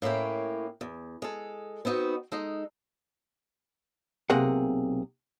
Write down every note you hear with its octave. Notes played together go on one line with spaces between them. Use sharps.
A2 A#3 C#4 E4 G5
E2
G#3 A4
B3 C4 D#4 F#4
G#3 D#4 A4
B1 C3 A#3 G#4 F#5